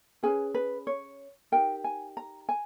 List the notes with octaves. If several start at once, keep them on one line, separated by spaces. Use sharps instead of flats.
C#4 G#4 B4 G#5
B4
C#5
D#4 G4 A#4 G5
G#5
A#5
G#5